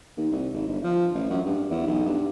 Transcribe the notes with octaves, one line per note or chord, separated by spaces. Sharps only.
D#2
C2
G#1
G1
F3
A1
F#2
G2
E2
B1
G2